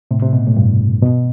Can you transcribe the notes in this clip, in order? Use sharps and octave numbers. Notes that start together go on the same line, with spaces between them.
A2 C3
C3
B2
A2
G2
B2